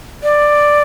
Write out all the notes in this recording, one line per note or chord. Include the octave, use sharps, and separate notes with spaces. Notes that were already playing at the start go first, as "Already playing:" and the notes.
D5